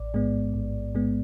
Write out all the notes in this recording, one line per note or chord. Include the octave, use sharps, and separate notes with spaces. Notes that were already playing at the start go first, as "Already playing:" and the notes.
Already playing: A1 D5
G#2 G#3 B3
A1
G#2 G#3 B3